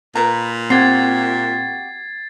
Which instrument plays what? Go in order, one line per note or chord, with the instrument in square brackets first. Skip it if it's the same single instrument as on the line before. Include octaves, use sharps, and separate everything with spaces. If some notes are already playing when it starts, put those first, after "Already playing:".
[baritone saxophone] A#2 [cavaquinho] A#4 B4 A#5
[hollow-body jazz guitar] C4 [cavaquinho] F#4 G4 F#5 [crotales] G#6 A6 C7